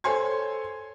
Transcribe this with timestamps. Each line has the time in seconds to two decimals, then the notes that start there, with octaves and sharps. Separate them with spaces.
0.04 A4 C5 C#5 G#5 C6 G#6